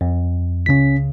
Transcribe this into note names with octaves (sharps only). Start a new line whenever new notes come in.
F2
C#2 C#3 C#4 B6